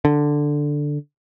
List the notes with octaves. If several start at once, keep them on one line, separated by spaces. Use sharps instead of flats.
D3